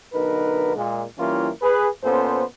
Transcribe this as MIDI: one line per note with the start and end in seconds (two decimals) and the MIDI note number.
0.13 0.73 35
0.13 0.73 50
0.13 0.73 63
0.13 0.73 70
0.13 0.73 71
0.76 1.04 46
0.76 1.04 56
1.18 1.49 52
1.18 1.49 55
1.18 1.49 58
1.18 1.49 61
1.18 1.49 64
1.18 1.49 65
1.62 1.88 68
1.62 1.88 71
2.03 2.44 46
2.03 2.44 59
2.03 2.44 61
2.03 2.44 69
2.03 2.44 72